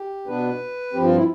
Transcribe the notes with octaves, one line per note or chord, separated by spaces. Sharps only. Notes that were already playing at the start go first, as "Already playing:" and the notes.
Already playing: G4
B2 B3 D4 B4
G2 F3 C4 G4
F4
E4